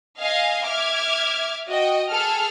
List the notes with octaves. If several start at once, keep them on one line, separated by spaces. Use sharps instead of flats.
D#5 F5 G#5
E5 D6 F6 G#6
F#4 D#5 G5
G#4 A4 F6